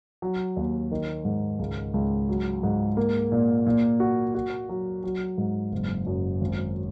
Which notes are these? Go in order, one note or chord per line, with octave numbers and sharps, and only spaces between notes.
F#3
D#2
D#3
G#2
C#2
C#2
F#3
G#2
A#3
A#2
A#2
F#4
F#4
F#3
F#3
G#2
F#1
F#2
G#1